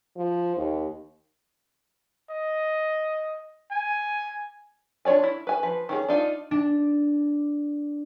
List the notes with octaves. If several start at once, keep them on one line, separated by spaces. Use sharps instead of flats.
F3
D#2
D#5
G#5
D4 F4 C#5 D5 G#5
E4
B4 G#5
F3 B4
D#3 C#4 G#4
D4 D#4 F4
D4